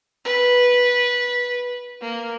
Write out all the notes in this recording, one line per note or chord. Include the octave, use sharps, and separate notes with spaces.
B4
A#3